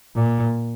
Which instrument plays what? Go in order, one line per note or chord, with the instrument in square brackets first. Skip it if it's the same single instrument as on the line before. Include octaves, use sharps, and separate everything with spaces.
[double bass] A#2